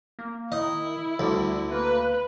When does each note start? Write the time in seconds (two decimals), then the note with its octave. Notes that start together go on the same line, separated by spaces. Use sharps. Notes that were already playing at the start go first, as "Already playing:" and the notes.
0.19 A#3
0.52 D#3 E4 D#5
1.19 D2 G3
1.72 A#3 B4